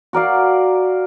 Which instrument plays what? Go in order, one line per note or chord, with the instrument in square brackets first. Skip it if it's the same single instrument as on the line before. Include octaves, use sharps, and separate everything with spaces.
[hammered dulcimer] F#4 A#4 D5 F5